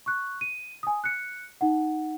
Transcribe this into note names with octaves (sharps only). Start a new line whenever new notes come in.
C#6 F#6
D#7
G#5 D#6
F#6 C#7
D#4 F#5